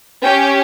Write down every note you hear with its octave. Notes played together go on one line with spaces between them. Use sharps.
C#4 G4 G5